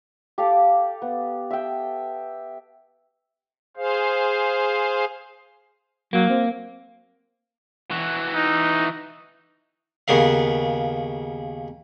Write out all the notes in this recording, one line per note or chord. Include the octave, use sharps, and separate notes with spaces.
G4 A4 F5 D6
B3
E5 G5
G#4 C5 F5
F#3 A#3
C4
E3 F#4
D#4
D#2 C#3 B3 A#4 F5